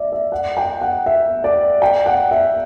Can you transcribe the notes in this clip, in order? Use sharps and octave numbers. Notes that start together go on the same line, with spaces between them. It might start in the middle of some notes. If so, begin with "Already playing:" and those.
Already playing: D5 E5
E5
F#5
G5
F#5
E5
D5
G5
F#5
E5